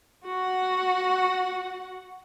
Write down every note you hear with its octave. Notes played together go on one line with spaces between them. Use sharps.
F#4 F#5